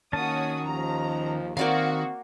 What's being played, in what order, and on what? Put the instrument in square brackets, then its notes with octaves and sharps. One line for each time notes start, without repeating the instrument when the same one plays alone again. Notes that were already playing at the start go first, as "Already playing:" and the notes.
[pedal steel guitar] D#3 C#4 A5 [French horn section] A#3 C#5 [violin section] F#4 D#6
[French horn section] D#2 F3 [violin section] A#5
[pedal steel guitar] D#3 [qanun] A#3 D5 F5 [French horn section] C4 [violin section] F#4